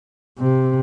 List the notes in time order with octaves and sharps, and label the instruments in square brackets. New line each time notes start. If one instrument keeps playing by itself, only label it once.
[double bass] C3